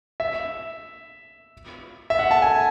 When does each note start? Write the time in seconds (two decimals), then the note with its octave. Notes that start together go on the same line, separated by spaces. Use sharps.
0.20 E5
2.10 E5
2.19 F#5
2.31 A5
2.42 G#5